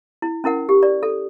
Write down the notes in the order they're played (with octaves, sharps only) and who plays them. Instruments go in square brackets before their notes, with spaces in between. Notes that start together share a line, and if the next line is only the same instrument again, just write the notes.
[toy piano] E4
C#4 E4 A#4 F#5
G4
D5
A4